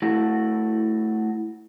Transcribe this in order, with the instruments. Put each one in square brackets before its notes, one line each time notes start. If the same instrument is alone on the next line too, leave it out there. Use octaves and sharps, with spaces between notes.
[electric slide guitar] A3 E4 F#4